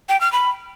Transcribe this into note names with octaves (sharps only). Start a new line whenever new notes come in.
G5
F6
B5